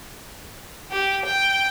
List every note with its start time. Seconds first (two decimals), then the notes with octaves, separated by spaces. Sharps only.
0.91 G4
1.25 G5